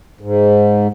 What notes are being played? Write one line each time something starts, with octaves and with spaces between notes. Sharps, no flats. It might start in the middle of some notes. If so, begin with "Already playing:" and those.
G#2